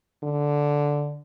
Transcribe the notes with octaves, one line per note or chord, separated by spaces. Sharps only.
D3